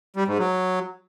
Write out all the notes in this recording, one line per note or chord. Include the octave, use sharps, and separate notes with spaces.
G3
G#2
F#3